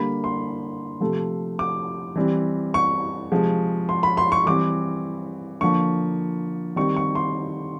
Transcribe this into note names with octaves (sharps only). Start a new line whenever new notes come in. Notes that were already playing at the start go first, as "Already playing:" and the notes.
Already playing: D3 G3 A#3 B5
C6
C3 F3 A3
D6
E3 G3 C4
C#6
C3 F3 G#3
C6
B5
C6
C#6
E3 G3 C4 D6
D3 F3 A#3 C#6
D#3 G3 C4 C#6
C#6
C6